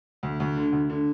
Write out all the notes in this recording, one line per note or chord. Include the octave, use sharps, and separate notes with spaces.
D2
D2
D3
D2
D3